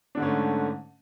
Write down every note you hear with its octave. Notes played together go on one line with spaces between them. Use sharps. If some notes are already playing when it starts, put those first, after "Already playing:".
G#2 D3 A3 C#4 D4